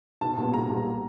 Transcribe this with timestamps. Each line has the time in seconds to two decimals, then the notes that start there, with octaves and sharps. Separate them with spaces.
0.21 B1 A5
0.37 A#2 G3 B3
0.54 B1 A#5
0.70 A#2 G3 B3